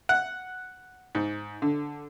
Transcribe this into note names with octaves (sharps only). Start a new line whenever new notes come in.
F#5
G#2
D3